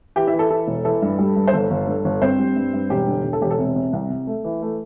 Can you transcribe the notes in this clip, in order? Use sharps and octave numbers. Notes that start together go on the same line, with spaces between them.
E3 G4 G5
E4 E5
E3
A4
E3 A4
E1
E3 A4
G2
G3
G2
C5
G1 A4
G1
G2
G1
G2 C4 C5
G3
G2
G2
E1 G4 G5
D3
E1
A4
E1 G4
A4
C3
C3
C2
C3
A3
E3
A3